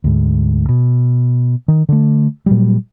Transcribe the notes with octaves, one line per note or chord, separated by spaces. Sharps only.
D2 G#2
B2
D#3
D3 A3
A#2 F#3 G3